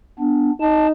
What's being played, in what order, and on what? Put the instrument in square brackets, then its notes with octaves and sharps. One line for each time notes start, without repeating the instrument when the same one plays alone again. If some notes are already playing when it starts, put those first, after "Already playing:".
[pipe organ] B3 D4
[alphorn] D#4 [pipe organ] A5